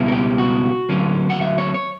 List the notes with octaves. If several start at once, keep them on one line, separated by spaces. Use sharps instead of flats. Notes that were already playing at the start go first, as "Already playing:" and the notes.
Already playing: C#2 B2 G3 C#4 E4
A#4
G4
F#4
D2 D3 F#3 A#3 C#4
F#5
E5
C#5
C#5